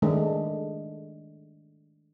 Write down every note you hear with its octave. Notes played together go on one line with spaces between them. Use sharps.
D#3 G#3 A3 D4